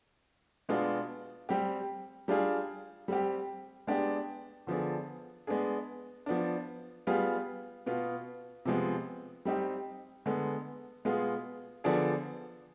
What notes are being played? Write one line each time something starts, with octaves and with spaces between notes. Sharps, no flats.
B2 G#3 B3 D4 F4
G3 C4 G4
G3 D4 F4 G#4
G3 C4 G4
G#3 B3 D4 G4
D3 F3 B3 D4 G#4
G#3 B3 D4 G#4
F3 B3 D4
G3 B3 F4 G#4
B2 B3 F4
C3 F3 G#3 B3
G3 C4 D#4 G4
D3 G#3 B3
B2 G#3 B3 F4 G#4
D3 F3 B3 D4 G#4